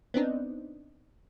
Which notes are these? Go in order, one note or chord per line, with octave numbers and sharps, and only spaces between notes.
B3 C4 D4 D#4